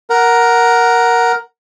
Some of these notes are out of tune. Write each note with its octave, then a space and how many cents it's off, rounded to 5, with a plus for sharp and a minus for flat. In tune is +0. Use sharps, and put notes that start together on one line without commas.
A#4 +5 F#5 +0